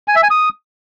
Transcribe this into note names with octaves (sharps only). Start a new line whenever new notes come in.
G#5
E5
G#5
D#6